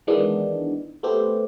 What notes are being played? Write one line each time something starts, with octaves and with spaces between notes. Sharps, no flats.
D#3 E3 G#3 B3 D4
A3 B3 C4 G4